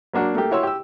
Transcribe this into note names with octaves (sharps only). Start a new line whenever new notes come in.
F#3 A#3 D4 F#4
A3 A#3 G4
E4 F#4 C#5 C6 E6
G4 E6